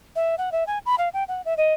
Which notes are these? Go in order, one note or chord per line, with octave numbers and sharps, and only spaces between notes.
E5
F#5
E5
G#5
B5
F5
G5
F#5
E5
D#5